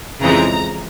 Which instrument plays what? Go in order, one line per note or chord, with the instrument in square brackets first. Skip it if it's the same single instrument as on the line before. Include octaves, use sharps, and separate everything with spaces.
[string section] F2 C#3 E3 G#3 C4 A#5